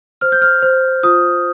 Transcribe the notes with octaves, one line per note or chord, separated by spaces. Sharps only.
C5 F6
G6
F6
C5
F4 D#6